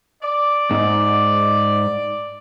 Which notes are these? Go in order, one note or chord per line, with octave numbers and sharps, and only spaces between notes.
D5
G#2